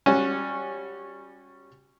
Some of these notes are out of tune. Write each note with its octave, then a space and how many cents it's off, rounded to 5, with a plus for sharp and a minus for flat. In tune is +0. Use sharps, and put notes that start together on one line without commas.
G3 +0 C#4 -10 F#4 -20